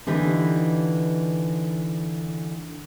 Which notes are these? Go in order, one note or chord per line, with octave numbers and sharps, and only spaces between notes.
D3 E3 D#4 G4 B4